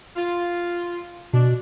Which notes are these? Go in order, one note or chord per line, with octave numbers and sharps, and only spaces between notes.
F4
B2 D4